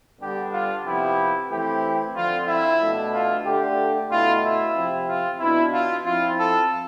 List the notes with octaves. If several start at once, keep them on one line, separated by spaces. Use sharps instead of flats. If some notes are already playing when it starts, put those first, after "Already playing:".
D3 G3 B3 D4 G4
F4
C3 F3 B3 E4 G4
E3 A3 C4 E4 G4
D3 F3 C4 F4
E4
B2 A3 D4
F4
D3 A3 D4 G4
B2 A3 E4 F4
E4
C3 F3 C4
F4
B2 B3 D4 E4
F4
F3 C4 E4 F4
A4